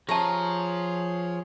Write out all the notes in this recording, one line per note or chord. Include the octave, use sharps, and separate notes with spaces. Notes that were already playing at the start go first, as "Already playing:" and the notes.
F3 G4 G#4 C#5 A5 A#5